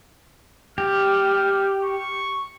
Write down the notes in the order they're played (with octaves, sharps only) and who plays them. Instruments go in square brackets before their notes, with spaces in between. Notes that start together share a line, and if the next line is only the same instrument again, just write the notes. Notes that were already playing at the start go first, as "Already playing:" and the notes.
[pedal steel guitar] G4 [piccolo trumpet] F6
[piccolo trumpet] C#6